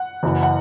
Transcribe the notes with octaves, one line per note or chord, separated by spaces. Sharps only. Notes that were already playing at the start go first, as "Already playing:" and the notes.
Already playing: F#5
F#1 F#2 E3
F#5